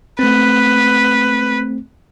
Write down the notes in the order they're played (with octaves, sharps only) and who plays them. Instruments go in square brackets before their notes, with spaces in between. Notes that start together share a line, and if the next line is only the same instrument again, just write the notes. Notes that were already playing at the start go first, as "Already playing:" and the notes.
[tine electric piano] A3 C4 [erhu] B4